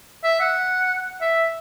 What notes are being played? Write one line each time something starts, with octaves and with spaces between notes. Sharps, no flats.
E5
F#5
E5